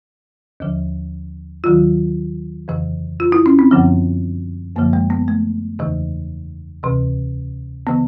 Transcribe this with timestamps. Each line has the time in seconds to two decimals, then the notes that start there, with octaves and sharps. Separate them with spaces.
0.60 D#2 D3 F3
1.64 D#2 D#3 F#3 F4
2.68 F2 C#3 E3
3.20 F4
3.32 E4
3.46 C#4
3.59 C4
3.71 F#2 D3 F3 B3
4.76 F#2 D3 F3 A#3
4.93 G#3
5.10 B3
5.28 A3
5.79 E2 C#3 E3
6.83 D2 C3 E3
7.87 C#3 E3 B3